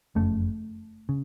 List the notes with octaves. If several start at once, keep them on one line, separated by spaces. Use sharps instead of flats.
F#1 F2 C#3 A3
C#3